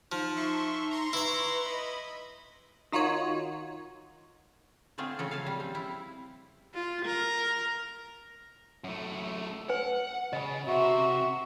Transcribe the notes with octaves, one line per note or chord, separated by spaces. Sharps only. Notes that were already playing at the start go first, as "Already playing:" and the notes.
F3 D#4
E5 C6 C#6
A#5 C6 C#6
E4 B4 E5
D#5 B5
D#3 D#4 F4 F#4 C#5
D3 A3 C4 F4 G#4
C#3 F3 A4
F5 G#5 A5
G3
C4
E4
F4
A#4
F#2 A3
B4 F#5 G#5
C#3 D#5 G#5
C3 F#4 E5